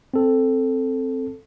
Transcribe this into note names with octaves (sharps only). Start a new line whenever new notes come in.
C4 A4